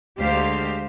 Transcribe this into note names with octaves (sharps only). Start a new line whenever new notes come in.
D2 G#3 G4 C5 F5